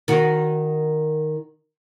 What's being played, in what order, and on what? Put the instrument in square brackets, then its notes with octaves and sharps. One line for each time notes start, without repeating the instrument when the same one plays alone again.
[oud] D#3 F#4